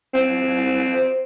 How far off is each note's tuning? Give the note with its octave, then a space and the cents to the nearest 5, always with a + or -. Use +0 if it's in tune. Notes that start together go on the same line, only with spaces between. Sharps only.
C4 +0